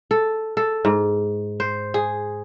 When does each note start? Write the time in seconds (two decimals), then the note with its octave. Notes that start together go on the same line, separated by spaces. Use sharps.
0.11 A4
0.57 A4
0.85 G#2
1.60 C5
1.94 G#4